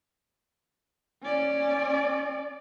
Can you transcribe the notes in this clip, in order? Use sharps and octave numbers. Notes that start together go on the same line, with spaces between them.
C#4 D5